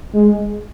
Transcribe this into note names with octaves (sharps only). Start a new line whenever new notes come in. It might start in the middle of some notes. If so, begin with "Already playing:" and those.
G#3